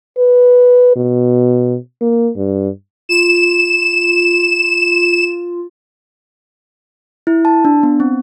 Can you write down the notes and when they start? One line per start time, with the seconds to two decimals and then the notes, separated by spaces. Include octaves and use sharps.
0.18 B4
0.96 B2
2.01 A#3
2.36 G2
3.09 F4 E7
7.27 E4
7.45 A5
7.65 D4
7.83 B3
8.00 C4